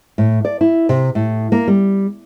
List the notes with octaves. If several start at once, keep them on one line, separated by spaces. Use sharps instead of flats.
A2
D5
E4
C3
A2
A#3
G3